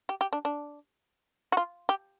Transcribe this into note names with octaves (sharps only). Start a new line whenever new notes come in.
G4
G4
D4
D4
F#4
F4
G4